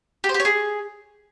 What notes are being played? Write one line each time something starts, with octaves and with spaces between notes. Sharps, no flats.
G4
C5
G4
C#5
G#4